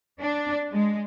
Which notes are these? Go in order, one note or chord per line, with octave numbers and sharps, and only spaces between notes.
D4
G#3